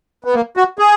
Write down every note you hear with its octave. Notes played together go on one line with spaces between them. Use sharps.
B3
A#3
F#4
G#4